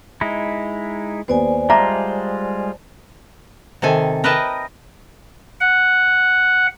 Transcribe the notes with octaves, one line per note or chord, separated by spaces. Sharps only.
G#3 D#4 E4
D#2 B3 C5 D5 G#5
G3 G#3 F4 E5 A5 A#5 D6
C3 D#3 A4 G#5
A#4 B4 D#5 E5 G5 A5
F#5